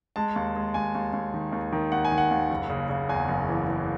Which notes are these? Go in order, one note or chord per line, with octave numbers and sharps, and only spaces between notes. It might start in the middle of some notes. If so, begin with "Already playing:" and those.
G#3 A5
D#2
G#3
D#2 G#5
D#2
D#2
D#3
D#2
D#3
D#2 F#5
G#5
D#3
F#5
D#2
F#1
C#3
C#3
E2 G#5
F#1
E3
E3